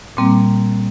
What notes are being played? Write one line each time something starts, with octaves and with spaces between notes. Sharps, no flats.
A#2 G3 A#3 C4